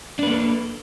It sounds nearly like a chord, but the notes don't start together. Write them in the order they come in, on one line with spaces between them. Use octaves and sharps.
D4 B4 A#3 A4